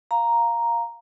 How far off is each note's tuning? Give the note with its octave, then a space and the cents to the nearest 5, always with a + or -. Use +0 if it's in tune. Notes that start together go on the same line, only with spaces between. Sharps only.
F5 +0 A#5 +0